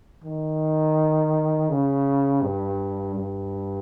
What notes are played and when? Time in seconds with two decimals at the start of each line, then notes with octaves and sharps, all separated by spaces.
0.24 D#3
1.69 C#3
2.42 G2
3.14 G2